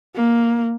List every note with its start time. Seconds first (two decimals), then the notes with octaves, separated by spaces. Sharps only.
0.15 A#3